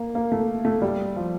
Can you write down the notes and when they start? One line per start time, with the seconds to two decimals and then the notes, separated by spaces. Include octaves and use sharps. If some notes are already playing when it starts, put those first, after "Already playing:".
Already playing: A#3
0.15 A#3
0.32 A3
0.65 A3
0.82 G3
1.16 F3